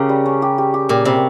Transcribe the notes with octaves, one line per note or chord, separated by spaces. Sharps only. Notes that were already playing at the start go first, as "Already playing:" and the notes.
Already playing: C#3 C#4 G4 A#4
G3
C#4
G4
G4
G4
A#2 G4
C3 G3